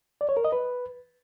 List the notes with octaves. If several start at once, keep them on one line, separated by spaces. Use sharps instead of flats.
D5
C#5
A#4
D#5
B4